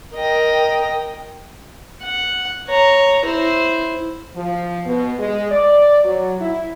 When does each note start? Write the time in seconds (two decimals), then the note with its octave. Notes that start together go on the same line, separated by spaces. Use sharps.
0.14 A#4 D#5 G5
2.02 F#5
2.68 C#5 A#5
3.25 E4 C5
4.35 F3
4.86 B2
5.19 G#3
5.51 D5
6.04 F#3
6.41 E4